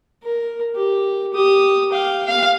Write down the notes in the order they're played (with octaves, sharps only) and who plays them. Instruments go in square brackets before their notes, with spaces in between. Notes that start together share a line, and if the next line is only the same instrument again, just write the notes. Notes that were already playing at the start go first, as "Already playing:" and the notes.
[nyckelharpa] A#4
G4
G4 D#6
F5 G5
F5